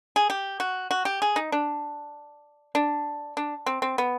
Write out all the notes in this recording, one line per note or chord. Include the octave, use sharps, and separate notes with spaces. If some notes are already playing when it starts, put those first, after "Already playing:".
G#4
G4
F#4
F#4
G4
G#4
D#4
D4
D4
D4
C4
C4
B3